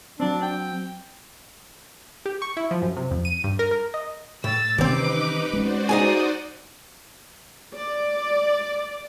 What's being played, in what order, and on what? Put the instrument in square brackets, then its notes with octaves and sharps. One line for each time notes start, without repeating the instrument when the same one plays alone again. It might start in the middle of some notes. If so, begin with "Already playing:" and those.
[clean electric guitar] F#3 C4 [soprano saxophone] D4
[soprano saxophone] G5
[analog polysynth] G4
C#6
E4
F3
F#2
C3
F2
D#7
G2
A#4
A#4
D#5
[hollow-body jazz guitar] A2 [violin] E6 A6
[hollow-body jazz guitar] C2 C4 [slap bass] D#3 E3 C#4 [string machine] D#4 B4 [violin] D6
[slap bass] G#3 C#4 [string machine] F#4 C5 D5
[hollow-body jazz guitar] D#4 G#4 G#5 [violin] D#6
[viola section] D5